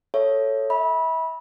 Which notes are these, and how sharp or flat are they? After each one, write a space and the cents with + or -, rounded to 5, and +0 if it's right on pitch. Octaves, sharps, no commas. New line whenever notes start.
A4 +0 C#5 +0 E5 +15
E5 -35 B5 -20